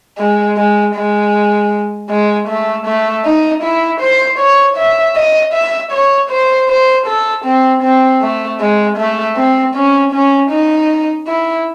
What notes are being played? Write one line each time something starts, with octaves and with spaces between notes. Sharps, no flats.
G#3
G#3
G#3
G#3
A3
A3
D#4
E4
C5
C#5
E5
D#5
E5
C#5
C5
C5
A4
C4
C4
A3
G#3
A3
C4
C#4
C#4
D#4
E4